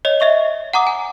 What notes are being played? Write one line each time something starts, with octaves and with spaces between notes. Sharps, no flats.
C#5 D#5 F7
D#5 E5 C#6 G7
F#5 A#5 D6 D#6
G#5